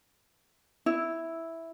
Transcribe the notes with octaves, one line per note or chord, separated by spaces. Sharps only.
E4